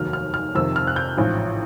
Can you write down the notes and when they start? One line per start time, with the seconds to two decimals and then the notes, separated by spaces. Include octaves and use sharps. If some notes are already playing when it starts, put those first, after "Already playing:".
Already playing: F1 D#2 D#3 F#3 F6
0.13 F6
0.34 F6
0.55 F2 C3 D#3 E6
0.76 F6
0.87 F#6
0.96 G6
1.17 A1 G#2 F3